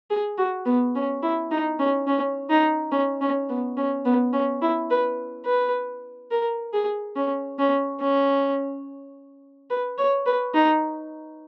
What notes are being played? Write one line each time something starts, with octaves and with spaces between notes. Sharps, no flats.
G#4
F#4
B3
C#4
E4
D#4
C#4
C#4
D#4
C#4
C#4
B3
C#4
B3
C#4
E4
B4
B4
A#4
G#4
C#4
C#4
C#4
B4
C#5
B4
D#4